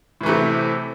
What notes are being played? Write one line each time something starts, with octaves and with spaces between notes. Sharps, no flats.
A2 C3 E3 A3